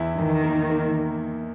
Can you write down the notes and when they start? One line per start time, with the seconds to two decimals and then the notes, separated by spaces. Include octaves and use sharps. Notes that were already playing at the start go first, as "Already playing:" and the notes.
Already playing: E2 E4
0.17 E2 D#3
0.44 A#3
0.70 A#3